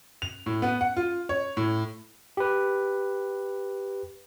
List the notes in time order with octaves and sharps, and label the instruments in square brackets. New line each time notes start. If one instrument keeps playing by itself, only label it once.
[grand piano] F7
A2
B3
F#5
F4
C#5
A2
[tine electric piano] G4 B4